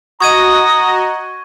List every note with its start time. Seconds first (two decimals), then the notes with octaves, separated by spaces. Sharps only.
0.21 F#4 D#5 A#5 C#6 D#6 G#6 D#7